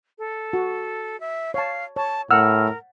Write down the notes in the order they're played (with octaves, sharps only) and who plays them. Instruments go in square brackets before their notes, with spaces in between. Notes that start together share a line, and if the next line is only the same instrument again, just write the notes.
[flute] A4
[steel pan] F#4
[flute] E5
[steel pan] C#5 A5 [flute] F5
[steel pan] C#5 [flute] A5
[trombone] A2 [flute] A#4 [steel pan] F#5 [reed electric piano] E6 F6